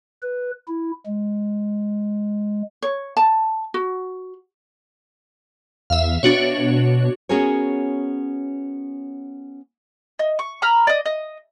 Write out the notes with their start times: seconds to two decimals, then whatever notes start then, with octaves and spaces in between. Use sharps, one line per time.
0.22 B4
0.68 E4
1.06 G#3
2.82 C#5
3.17 A5
3.74 F#4
5.90 E2 E5 F5
6.23 B2 D4 F#4 C#5
7.29 B3 C#4 F#4 G#4 A#4 C#5
10.19 D#5
10.39 C#6
10.62 A#5 B5 F6
10.87 D5 D#5
11.06 D#5